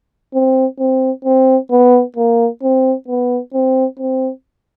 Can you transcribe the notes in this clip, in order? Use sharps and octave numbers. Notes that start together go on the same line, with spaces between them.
C4
C4
C4
B3
A#3
C4
B3
C4
C4